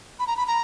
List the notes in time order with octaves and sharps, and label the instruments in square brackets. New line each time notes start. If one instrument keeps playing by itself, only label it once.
[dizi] B5
A#5
B5
A#5